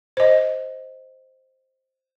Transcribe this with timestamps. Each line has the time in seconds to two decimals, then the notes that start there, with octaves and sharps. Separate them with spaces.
0.17 C5 D#5